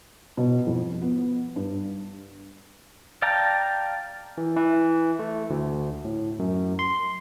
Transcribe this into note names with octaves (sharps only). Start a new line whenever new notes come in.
B2
F2
B3
G2
D5 F5 G5 A5 A#5
E3
E3
A3
D2
A2
F#2
C6